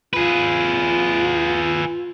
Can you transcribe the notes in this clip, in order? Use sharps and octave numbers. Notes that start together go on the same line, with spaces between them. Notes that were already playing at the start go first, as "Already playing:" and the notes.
F4 G#4 B4